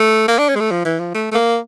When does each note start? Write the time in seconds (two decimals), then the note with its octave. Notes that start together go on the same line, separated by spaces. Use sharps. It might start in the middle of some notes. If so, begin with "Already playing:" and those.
Already playing: A3
0.28 A#3
0.38 D4
0.49 C#4
0.55 G#3
0.60 A3
0.71 F3
0.85 E3
0.99 F3
1.14 A3
1.32 A3
1.35 A#3